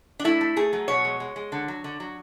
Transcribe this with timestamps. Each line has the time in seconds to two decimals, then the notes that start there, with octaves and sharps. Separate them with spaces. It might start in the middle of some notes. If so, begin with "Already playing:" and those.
0.20 D4
0.24 A3 E4
0.41 A3
0.56 A3 G#4
0.73 F#3
0.88 B2 C#5
1.05 G#3
1.20 G#3
1.36 G#3
1.52 D3
1.68 F#3
1.84 D3
2.00 F#3